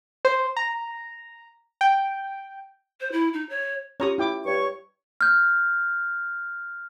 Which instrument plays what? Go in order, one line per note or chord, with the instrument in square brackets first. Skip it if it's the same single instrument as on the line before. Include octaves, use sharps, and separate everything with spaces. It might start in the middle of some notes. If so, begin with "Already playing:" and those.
[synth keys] C5
A#5
G5
[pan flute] C5
E4
D#4
C#5
[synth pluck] C#4 F4 G4 [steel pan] C#5 A#5 D#6
[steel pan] E4 G5 D6
[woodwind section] G2 C#5 C#6
[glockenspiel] F6 G6